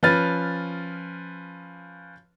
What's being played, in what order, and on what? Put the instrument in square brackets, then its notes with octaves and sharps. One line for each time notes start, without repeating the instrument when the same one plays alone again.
[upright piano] F3 C#4 B4 F6 A6